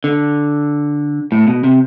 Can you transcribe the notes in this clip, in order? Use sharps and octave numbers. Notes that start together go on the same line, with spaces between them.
D3
A2
B2
C3